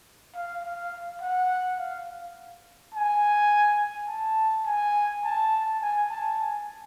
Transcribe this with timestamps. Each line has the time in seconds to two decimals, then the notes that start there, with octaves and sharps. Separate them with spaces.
0.35 F5
0.63 F5
1.21 F#5
1.78 F5
2.94 G#5
4.08 A5
4.66 G#5
5.24 A5
5.82 G#5
6.10 A5
6.38 G#5